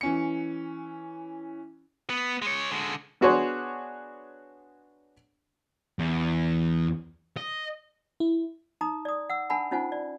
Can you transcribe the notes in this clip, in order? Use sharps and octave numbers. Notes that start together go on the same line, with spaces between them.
E3 C#4 C#7
B3
G#3 C#5
D3 G#3
B3 D4 F#4 G#4 C5 C#5
E2
D#5
E4
D#4 A#5 D#6
D5 D#6
F#5 E6
D4 A#4 F#5 G#5 A5 B5
C#4 D#4 F4 C5 F#5 G#5
D5